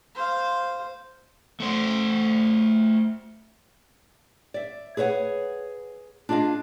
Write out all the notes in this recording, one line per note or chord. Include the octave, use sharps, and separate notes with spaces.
C5 F5
A3 C5
D5 E5
G#4 B4 C#5 E5 F#5
D4 F4 G#4 D#5 F5